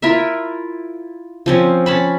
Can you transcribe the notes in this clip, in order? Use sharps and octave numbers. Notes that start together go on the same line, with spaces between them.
E4 F4 A#4 E5
F3 C4 C#4
C#4 A5 B5